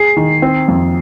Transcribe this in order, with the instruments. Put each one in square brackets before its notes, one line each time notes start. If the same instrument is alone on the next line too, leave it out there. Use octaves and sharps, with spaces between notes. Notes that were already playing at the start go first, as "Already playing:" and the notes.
Already playing: [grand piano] G#4 [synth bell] C7
[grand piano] D#3
C4
F2